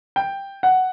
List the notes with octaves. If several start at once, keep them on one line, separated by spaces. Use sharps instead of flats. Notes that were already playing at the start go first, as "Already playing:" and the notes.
G5
F#5